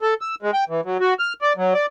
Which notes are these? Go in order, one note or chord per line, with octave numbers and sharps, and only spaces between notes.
A4
E6
G#3
G5
E3
F#3
F#4
F6
D5
F#3
D5